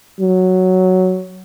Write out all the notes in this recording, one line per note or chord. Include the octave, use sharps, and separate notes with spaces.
F#3